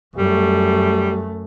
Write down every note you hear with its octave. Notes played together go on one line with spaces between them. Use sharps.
F#2 G3 A3